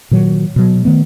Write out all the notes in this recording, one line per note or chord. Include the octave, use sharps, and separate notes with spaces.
A#2 D#3 F#3
B2 F#3
D#3 A3 B3